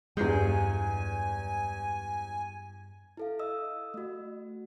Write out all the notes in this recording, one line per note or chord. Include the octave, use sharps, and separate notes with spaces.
E2 G2 G#3 G#5 G6 C7 C#7
E4 A4 F5
D#5 D#6 E6
A3 F#4